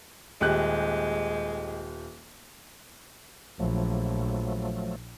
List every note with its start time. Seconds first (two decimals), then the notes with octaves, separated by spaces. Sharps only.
0.41 D#1 G#3 G4 F#6
3.59 A#1 F3 F#3 A3